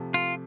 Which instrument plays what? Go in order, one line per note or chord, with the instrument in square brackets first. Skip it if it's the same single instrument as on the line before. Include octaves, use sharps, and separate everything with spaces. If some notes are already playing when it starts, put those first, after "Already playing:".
Already playing: [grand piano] C3 F3 A3
[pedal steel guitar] F4